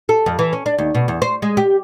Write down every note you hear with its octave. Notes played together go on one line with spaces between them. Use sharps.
A4
F2
E3
C#4
D4
D#2
B2
E2
C5
G#3
G4